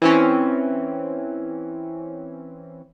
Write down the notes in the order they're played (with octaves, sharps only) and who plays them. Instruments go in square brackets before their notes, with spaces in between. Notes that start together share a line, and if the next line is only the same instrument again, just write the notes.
[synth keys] E3 C4 C#4